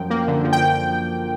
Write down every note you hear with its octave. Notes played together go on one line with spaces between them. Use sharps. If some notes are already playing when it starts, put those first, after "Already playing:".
Already playing: F#2 F3 G5
A#3
D3
F3
G5